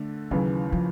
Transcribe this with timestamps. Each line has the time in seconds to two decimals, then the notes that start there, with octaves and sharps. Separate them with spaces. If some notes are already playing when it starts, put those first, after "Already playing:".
Already playing: D3 A3
0.31 D#2 C#3 E3 F#3
0.72 F3